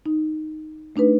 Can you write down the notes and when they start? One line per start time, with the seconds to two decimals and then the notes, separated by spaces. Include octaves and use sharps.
0.06 D#4
0.96 A3 D4 D#4 B4